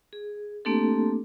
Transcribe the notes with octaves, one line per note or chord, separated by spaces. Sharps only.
G#4
A3 A#3 C4 D4 G4 A4